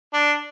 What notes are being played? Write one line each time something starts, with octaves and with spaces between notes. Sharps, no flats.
D4